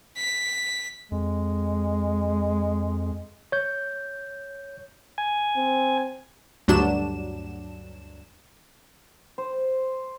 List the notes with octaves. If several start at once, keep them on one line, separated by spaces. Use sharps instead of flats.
B6
F2 G#3
C#5 G6
G#5
C4
D2 G2 F#3 D4 E7
C5